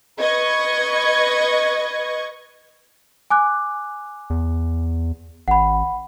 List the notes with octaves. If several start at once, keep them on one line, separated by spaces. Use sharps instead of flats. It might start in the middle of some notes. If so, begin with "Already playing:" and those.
B4 D#5 C#6 G#6
G#5 D6 F#6
E2
G#1 F#5 B5